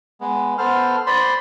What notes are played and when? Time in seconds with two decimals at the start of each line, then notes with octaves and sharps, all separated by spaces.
0.21 G#3 B3
0.58 B3 A4 C5 F6
1.07 C5 D5 B5 C6